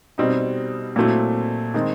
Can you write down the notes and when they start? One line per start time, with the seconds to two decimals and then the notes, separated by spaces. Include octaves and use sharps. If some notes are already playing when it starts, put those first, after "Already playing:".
0.18 B2 G3 C4 D#4
0.96 A#2 F#3 A3 C4 E4
1.74 D#3 G#3 C4 D#4